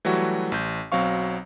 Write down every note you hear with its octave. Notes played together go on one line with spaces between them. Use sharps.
E3 F#3 G3 A3 F#4
A1 G6
B1 F#3 C4 F5 C#6